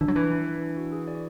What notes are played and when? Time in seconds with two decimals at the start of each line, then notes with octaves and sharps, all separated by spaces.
0.01 E3 D4
0.08 F#3
0.16 E3 B4
0.31 D4
0.47 D4
0.61 D4
0.77 F#4
0.92 G#4
1.08 D5